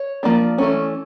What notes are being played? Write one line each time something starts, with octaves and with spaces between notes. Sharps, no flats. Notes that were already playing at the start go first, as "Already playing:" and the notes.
Already playing: C#5
F3 A#3 D4 D5
E3 A3 C#4